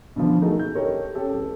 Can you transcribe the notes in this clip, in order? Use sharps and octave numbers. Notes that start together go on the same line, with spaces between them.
B2 D3 E3 F3
A3 D#4 F#4 G#4 A#4
G6
G4 A4 A#4 C#5 D#5
C#4 G4 A4
D1 A4